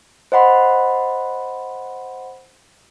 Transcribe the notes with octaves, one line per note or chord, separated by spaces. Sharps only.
C5 D#5 F#5 B5 C6